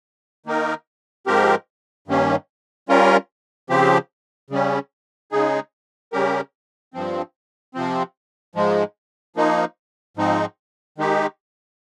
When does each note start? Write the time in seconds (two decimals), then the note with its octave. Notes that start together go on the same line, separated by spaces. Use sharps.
0.46 D#3 A#3 D#4 A#4
1.26 G#2 F3 C4 G4 A#4
2.08 G2 D#3 A#3 C#4
2.89 G3 C#4 F4 A#4
3.70 C#3 F3 C4 G4
4.50 C#3 G3 C#4
5.32 C#3 G#3 D#4 G#4
6.13 C#3 G3 C#4 G4 A#4
6.94 G2 F3 C4
7.74 C3 F3 C4
8.55 G#2 F3 G#3
9.36 F3 A#3 D#4
10.17 G#2 F3 C4 D#4
10.98 D#3 G#3 D#4 G4